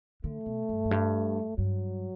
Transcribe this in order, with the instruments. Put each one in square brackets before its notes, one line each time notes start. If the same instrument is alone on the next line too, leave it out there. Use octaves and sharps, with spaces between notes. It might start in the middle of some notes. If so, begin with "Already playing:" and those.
[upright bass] D3 [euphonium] A3
[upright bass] B2
G2
F#2
G2
[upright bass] G2 [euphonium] F#3